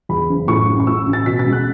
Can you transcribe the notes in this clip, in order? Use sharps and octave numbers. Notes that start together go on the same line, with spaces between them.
E2 B5
F#1
A2 C#6
A1
C#6
A2 E6
A1
A6
B2 B6
A6
C#2
F#6